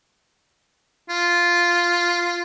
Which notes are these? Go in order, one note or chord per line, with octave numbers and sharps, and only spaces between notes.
F4